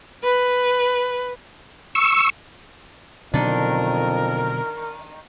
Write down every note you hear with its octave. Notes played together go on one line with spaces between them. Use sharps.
B4
C#6 E6
F2 B2 D3 D#3 F#3 D4 A#4